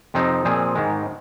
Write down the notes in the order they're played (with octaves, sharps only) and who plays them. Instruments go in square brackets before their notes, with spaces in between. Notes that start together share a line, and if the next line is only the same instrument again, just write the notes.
[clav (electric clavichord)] F2 C3 F3 C4 D#4
A#2 F3 C4 G#4
G#2 D#3 G#3